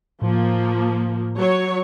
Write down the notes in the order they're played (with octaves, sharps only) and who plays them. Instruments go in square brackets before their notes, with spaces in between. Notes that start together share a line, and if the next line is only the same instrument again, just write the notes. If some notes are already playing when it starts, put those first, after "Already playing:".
[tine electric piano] A2 [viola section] F3 A#3
[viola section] F#3 C#5